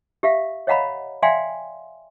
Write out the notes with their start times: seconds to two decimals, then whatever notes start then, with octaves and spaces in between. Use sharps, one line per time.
0.23 G4 E5 F5
0.67 C#5 D#5 F5 F#5 A#5 B5
1.22 D5 E5 F5 G5 G#5 C6